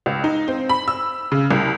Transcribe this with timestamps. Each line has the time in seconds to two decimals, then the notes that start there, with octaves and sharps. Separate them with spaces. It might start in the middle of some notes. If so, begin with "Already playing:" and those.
0.06 C#2
0.24 D#4
0.48 C4
0.69 B5
0.88 E6
1.32 C#3
1.51 C2